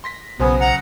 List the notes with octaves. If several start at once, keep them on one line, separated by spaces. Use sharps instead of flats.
C6 A#6 B6
B1 C#3 F#3 B3 C5 G#5
F#5 A#5